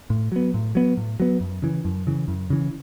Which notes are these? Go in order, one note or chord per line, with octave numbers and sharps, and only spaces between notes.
A2
F#3 B3
A2
F#3 B3
A2
F#3 B3
F#2
C#3 E3
F#2
C#3 E3
F#2
C#3 E3